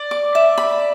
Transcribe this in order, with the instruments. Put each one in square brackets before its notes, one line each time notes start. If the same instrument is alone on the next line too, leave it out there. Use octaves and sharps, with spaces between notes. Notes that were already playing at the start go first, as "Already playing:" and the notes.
Already playing: [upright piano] D5
[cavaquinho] D6
E5
B5